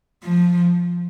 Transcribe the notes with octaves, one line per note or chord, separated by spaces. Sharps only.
F3